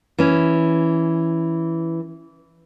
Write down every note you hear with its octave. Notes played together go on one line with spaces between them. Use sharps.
E3 C#4